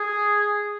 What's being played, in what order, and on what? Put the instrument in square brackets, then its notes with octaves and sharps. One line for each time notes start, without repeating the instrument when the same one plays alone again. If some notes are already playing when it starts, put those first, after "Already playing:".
Already playing: [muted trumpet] G#4